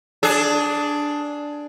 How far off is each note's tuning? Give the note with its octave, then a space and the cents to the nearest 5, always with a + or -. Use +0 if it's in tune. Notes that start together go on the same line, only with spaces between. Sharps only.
D4 +0 G#4 +15